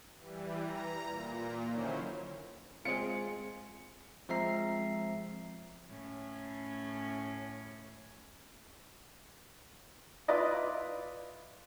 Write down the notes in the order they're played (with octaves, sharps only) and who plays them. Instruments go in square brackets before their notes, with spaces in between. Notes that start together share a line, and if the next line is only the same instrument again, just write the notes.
[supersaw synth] E3 G3
A#5
A#2
D3 D#3 F#3 C#4 E4 C5
[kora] G#3 F4 [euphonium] C4 [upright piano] C#7
[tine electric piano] F3 G#3 C4 E5 A#5 C7
[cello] A2 C#4
[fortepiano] E4 F4 B4 D5 D#5